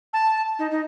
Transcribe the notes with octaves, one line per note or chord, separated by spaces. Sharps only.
A5
D#4
D#4